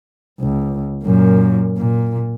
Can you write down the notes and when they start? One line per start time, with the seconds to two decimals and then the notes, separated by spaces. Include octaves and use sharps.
0.40 C#2
1.03 F#2 A#2
1.77 A#2